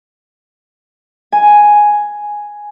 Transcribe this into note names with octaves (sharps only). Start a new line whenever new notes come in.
G#5